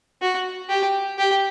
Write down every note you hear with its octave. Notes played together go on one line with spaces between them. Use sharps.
F#4
G4
G4